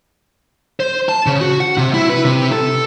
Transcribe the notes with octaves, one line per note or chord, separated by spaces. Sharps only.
C5
A5
C#3
F#4
F#5
C3
E4
B4
C3
A4